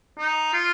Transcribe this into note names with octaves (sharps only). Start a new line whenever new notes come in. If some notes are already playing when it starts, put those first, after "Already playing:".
D#4
F4